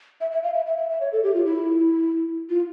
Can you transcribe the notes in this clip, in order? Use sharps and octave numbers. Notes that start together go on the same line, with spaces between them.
E5
E5
F5
E5
E5
E5
E5
C#5
A4
G4
F4
E4
F4